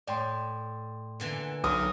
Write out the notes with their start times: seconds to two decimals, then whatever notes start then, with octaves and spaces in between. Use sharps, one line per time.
0.07 A2 D5 G5 C6
1.20 A#2 D3 E3
1.64 B1 F#3 D#6 F6